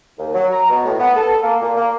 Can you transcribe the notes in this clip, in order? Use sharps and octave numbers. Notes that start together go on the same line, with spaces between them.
D#2
F#3
A#5
B2
A2
B3
A4
A#3
A#2
A#3